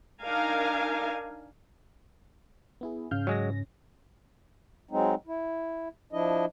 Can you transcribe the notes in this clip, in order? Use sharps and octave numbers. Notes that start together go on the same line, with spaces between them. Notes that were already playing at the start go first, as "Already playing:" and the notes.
D4 D#4 A#4 F5 G#5
B3 E4 G#4
G#2 C#3 F5 F6 G6
F#3 G#3 C#4 A#6
F#3 G#3 C4 D#4
E4
F3 D4 E4 D#5